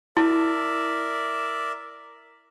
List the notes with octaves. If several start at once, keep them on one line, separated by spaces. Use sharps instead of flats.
E4 A#4 D5 E5